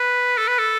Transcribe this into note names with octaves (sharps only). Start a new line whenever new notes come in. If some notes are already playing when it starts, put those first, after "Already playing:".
Already playing: B4
A4
B4
A4